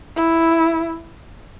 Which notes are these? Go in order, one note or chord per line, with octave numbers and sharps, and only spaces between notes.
E4